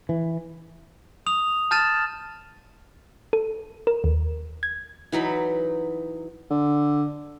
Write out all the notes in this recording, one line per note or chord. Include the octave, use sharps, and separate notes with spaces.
E3
D#6 F7
A5 F6 G6 A6 D#7 E7
A4
A#4
D#2
G#6
E3 F#3 D#4 B5
D3